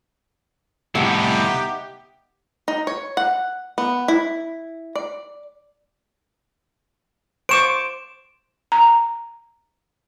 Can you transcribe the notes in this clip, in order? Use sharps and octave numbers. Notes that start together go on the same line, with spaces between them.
C2 A2 B3 D#4 G4 E5
D#4
C#5
F#5
B3
E4
D5
C5 C#6 D6 D7 E7
A#5